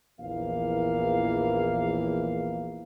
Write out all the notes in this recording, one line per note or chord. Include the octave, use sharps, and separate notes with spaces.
A#1 E2 E3 A#3 F5